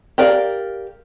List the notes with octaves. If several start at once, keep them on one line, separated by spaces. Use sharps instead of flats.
G4 A#4 D5 F5